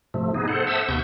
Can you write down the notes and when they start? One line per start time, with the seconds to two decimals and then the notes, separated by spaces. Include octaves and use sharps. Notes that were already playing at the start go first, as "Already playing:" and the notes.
0.14 G#2 C3 F3 A3
0.34 B3 D#4 G#4
0.48 A4 C5 F#5
0.67 C5 E5 F#5 A5 D#6 E6
0.89 D#2 C3 B3 C#6 G6